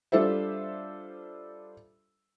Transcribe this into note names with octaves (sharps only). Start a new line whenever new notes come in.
G3 D4 F4 A4 C5 E5